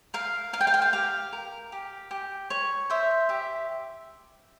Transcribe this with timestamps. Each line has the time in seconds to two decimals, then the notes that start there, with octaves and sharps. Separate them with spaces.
0.14 A#4 F5
0.53 A#4 F5
0.61 G5
0.67 F5
0.74 G5
0.82 F5
0.93 G4 F5
1.33 A#4
1.72 G4
2.11 G4
2.50 C#5
2.90 C5 E5
3.29 G4 E5